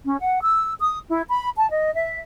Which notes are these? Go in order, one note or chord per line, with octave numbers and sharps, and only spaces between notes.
C#4
F#5
E6
D#6
E4
B5
A5
D#5
E5